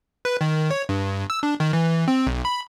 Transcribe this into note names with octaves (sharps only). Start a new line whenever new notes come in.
B4
D#3
C#5
G2
E6
D4
D#3
E3
C4
B1
B5